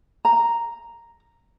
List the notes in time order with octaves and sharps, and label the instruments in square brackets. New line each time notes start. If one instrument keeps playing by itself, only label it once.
[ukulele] A#5